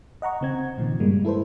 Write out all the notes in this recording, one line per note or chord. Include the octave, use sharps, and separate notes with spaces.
D#5 F#5 A#5 C#6
C#3 C4 G#6
A#2 D#3 F3
G2 G3 G#3 A#3
E4 A4 B4 C5